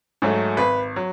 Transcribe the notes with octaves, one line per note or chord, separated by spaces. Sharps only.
G#2 F#3 A3
G#1 B4
F#3